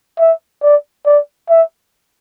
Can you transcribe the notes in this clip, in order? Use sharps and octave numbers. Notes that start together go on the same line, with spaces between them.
E5
D5
D5
E5